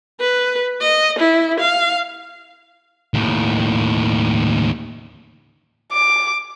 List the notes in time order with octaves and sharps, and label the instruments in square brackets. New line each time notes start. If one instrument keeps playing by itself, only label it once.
[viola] B4
D#5
E4
F5
[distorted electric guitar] D#2 A2
[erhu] D6